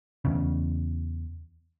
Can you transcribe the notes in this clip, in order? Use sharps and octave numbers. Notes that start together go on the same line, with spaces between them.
E2 C#3